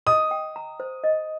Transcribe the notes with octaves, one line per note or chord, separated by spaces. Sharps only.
D#5 D#6
G5
A#5
C5
D#5